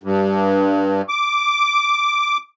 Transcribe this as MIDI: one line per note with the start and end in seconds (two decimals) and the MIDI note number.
0.04 1.02 43
1.09 2.37 86